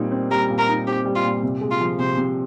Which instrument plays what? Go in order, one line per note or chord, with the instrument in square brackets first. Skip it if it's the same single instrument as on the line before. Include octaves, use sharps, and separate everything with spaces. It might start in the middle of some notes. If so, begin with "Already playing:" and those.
Already playing: [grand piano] A#2 G3 C4 D#4
C4
[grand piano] G3 [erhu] A#4
[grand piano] A#2
[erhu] A#4
[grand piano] D#4
[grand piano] C4 [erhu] G4
[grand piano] G3
[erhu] F4
[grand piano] A#2
C3
G#3
[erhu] F4
[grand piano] F3
[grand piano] C3 [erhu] C5
[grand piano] C3